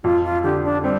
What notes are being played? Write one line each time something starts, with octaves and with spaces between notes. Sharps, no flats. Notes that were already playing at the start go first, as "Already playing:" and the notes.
F2 F4
F4
D3 G4
D4
G3 C4